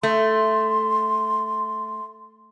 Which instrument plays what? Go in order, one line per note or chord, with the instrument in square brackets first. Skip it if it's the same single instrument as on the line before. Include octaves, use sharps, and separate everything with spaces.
[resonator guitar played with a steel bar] A3 [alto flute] C6